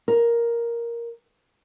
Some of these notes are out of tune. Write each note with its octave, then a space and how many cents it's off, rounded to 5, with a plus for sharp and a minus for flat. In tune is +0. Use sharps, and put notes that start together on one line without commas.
A#4 +5